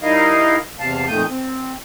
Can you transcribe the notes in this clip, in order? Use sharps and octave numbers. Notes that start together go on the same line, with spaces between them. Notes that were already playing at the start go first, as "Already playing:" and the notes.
G3 D#4 E4 A#4 D#5 F5
E2 C3 F5 A5
F2 A#2 D#3 A3 D#6 G6
C4